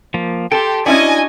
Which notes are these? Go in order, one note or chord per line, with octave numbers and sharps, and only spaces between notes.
F3 A#3
G4 A4 G5 A5 C6
C#4 D4 E4 F#4 D5 D#5 G#5